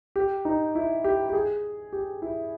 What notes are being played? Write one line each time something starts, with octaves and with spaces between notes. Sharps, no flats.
G4
D#4
E4
G4
G4
G#4
G4
E4